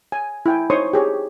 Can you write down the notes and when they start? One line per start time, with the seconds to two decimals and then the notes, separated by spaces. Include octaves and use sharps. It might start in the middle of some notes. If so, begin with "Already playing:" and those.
0.12 G#5
0.46 E4 G5 G#5
0.70 D#4 C5 C#5 C6 C#6 D#6
0.93 G4 G#4 C#5